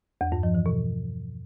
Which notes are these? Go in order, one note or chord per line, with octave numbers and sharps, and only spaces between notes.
E2
G2
F3
E3
B2